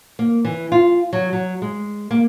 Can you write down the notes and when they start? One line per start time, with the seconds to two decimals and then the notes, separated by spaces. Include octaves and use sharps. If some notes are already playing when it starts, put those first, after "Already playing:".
0.19 A#3
0.45 E3
0.72 F4
1.13 F#3
1.33 F#3
1.62 G#3
2.11 A#3